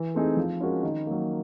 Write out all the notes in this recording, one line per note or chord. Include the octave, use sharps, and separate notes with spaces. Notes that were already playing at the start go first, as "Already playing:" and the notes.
Already playing: E3
A3 C4 D#4 G#4
F3
G#3 C#4 F#4 A#4
D#3
F#3 A#3